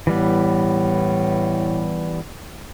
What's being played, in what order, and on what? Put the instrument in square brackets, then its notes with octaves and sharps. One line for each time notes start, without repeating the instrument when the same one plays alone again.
[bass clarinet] A2 [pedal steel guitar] E3 G3 B3